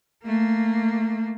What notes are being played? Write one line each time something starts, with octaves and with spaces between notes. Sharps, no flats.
A3 A#3